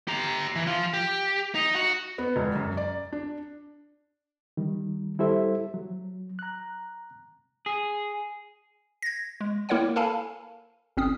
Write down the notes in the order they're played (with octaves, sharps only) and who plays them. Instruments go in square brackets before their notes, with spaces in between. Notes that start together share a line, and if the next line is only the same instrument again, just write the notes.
[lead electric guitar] G4 A#5
E3
F3 F4
G4
D#4
F#4
[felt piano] B3
E1
F#2
D5
D4
[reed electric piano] D#3 G3
G3 E4 G4 A4 C5 E5
F#3
A#5 F#6
[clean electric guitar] G#4
[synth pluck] G#6 A#6
G#3
A#3 E4 A#4 C#5 F#5 G5
A4 A#4 F5 G#5 A5 B5
G1 C4 C#4 D#6